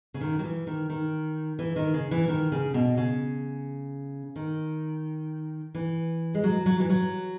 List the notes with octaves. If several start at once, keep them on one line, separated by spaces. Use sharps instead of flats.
C#3
D#3
F#3
E3
D#3
D#3
E3
D#3
C#3
E3
D#3
C#3
B2
C#3
D#3
E3
G#3
F#3
F#3
E3
F#3